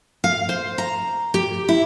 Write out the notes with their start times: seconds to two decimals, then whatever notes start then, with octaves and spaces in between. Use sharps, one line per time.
0.24 F5
0.49 C5
0.78 A#5
1.34 G4
1.69 E4